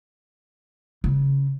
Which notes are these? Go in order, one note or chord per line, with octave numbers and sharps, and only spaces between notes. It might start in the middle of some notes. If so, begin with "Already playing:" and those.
C#3